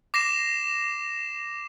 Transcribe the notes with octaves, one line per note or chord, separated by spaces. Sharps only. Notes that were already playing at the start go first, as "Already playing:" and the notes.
D6 A#6 C7 E7